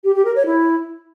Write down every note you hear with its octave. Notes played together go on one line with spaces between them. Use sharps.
G4
G4
A#4
C#5
E4